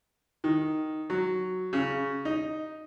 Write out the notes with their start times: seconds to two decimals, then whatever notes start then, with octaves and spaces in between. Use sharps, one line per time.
0.44 D#3
1.10 F#3
1.73 C#3
2.25 D#4